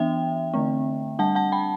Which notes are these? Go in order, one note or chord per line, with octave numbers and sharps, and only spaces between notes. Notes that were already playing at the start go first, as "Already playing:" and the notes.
Already playing: E3 B3 D4 E5 G5
D3 A3 C4
G3 D4 F#5 A5
F#5 A5
G5 B5